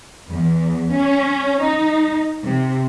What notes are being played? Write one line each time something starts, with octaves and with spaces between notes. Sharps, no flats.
E2
C#4
D#4
C3